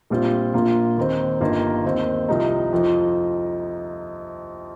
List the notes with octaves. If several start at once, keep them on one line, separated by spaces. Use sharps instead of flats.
A#1 A#2 G3 C4 F4
A#1 A#2 A#3 F4
D#2 D#3 C4
G1 G2 D#3 A#3 F4
D#2 D#3 C4
C2 C3 F3 D#4
F2 F3 D#4